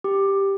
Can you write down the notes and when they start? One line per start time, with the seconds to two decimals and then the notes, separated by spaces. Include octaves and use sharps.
0.04 G4